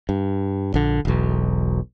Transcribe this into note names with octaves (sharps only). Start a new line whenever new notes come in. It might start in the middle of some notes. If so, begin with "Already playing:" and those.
G2
A#1 D3
E1 B1